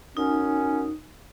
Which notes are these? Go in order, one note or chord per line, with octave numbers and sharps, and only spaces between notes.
F#2 C#4 D#4